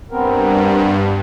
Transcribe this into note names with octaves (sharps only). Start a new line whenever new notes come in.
G2 B3 C4 A#4